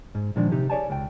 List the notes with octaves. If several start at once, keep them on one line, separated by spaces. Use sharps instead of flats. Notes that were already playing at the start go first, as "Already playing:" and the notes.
G#2
A#2 D#3 F3 G#3 D4
C3 D#4 G4
G#4 C#5 D5 G#5 A5
C#2 G5